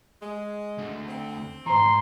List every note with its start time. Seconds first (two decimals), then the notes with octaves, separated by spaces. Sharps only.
0.22 G#3
0.78 D2 D3
1.08 C4
1.66 G#2 E3 C5 A#5 C6